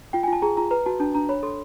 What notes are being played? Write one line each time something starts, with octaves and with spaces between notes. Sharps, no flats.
F4 G5
F4 G#5
A5
G#4 A#5
F4 A#5
B4 A#5
F#4 A5
D4 A5
D4 A#5
C#5 B5
A4 C6